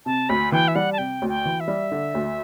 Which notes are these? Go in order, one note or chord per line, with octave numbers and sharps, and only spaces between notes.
C3 A5
D2 B5
E3 G5
E5
G3 F#5
A5
C3 G5
D2
G5
E3
E5
G3
D3
D2